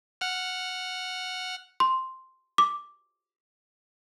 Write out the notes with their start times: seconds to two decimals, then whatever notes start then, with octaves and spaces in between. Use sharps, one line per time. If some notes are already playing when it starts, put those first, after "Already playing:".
0.21 F#5 F6
1.80 C6
2.58 D6